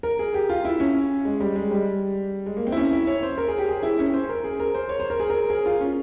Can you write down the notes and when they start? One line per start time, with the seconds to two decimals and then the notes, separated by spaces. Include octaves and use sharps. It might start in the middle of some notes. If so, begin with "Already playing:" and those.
0.03 A#4
0.19 G#4
0.34 G4
0.50 F4
0.65 E4
0.80 C#4
1.25 G#3
1.40 G3
1.56 G#3
1.71 G3
2.46 G#3
2.57 A#3
2.67 C4
2.72 E4
2.77 C#4
2.92 E4
3.07 C#5
3.23 C5
3.38 A#4
3.48 G#4
3.58 G4
3.68 G#4
3.83 E4
3.99 C#4
4.14 C5
4.29 A#4
4.44 G#4
4.60 A#4
4.75 C5
4.89 C#5
5.00 C5
5.10 A#4
5.20 G#4
5.30 A#4
5.50 G#4
5.66 F4
5.81 C#4